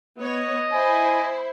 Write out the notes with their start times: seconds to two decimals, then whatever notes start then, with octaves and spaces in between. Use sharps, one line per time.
0.19 B3 C#5 D#5
0.73 E4 C5 G#5